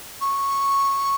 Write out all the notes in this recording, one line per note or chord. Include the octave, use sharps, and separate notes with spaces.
C#6